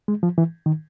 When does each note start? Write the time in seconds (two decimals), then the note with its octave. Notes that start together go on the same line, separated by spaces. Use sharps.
0.08 G#3
0.23 F3
0.38 E3
0.66 D#3